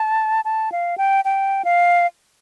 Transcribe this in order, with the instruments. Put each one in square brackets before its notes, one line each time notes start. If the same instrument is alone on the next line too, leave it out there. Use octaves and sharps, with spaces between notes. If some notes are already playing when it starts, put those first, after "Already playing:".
Already playing: [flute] A5
A5
F5
G5
G5
F5